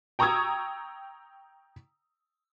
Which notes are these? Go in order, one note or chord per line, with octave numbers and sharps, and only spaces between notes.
G5 A#5 C#6 D#6 E6 G#6